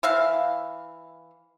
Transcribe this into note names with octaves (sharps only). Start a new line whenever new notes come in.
E3 E5 F5